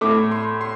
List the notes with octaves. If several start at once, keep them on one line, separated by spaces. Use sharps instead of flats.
A2 A3 D6
C6
C6